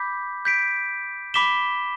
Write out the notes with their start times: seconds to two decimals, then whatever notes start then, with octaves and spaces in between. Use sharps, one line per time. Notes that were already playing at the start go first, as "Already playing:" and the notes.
Already playing: B5 D6 G6 B6
0.45 G6 B6 D7
1.34 B5 D6 B6 E7 G7